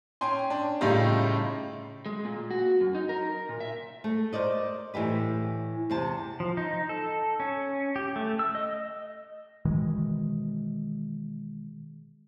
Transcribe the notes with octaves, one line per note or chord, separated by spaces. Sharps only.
C#4 G5 G#5 C6
D4
A2 C#3 G3 D#4 F4 G4
G#3
A#2
F#4
F#2
D#4
A#4
A#2
E5
A3
A#4 C5 D5 D#5
A2 E3 G4 B4
E2 C3 A5
F3
D#4
A4
C#4
G4
A3
E6
D#5
B2 D#3 E3 G#3